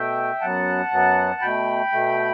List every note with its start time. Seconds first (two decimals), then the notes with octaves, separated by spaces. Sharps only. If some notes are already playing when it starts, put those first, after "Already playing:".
Already playing: B2 A3 E5 G5
0.41 F#2 F#3 B3 F#5 A5
0.91 F#2 F#3 B3
1.41 B2 A3 G5 B5
1.92 B2 A3